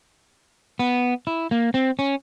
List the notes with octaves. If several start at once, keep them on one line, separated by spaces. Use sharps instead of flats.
B3
E4
A#3
C4
C#4